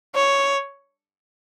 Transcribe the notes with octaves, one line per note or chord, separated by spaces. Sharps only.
C#5